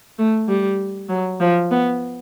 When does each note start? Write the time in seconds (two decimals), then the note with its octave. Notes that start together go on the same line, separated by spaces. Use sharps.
0.19 A3
0.48 G3
1.09 F#3
1.40 F3
1.71 B3